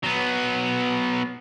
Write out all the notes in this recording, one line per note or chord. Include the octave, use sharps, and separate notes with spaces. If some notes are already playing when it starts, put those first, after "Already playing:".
F#3 B3